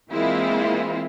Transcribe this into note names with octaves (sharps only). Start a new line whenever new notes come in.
E3 G#3 A#3 C4 E4 F4